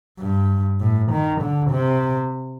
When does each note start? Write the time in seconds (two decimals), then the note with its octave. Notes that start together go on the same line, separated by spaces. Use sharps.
0.19 G2
0.80 A2
1.11 D#3
1.41 D3
1.71 C3